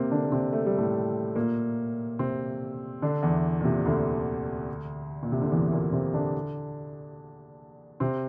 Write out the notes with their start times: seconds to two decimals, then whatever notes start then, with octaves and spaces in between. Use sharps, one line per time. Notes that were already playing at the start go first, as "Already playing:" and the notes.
Already playing: C3 A#3 C4
0.11 D3 D4
0.25 A#3
0.32 C3 C4
0.53 A3
0.66 G3
0.78 A2 A3
1.36 A#2 A#3
2.19 C3 C4
3.02 D3 D4
3.23 E2 E3
3.61 A#2
3.64 C3
3.85 D2 D3
5.23 A#2
5.32 C3
5.41 D3
5.51 E2 E3
5.72 A#2 A#3
5.93 C3 C4
6.13 D3 D4
8.00 C3 C4